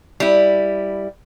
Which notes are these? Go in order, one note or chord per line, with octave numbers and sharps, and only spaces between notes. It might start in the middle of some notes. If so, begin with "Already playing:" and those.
G3 E4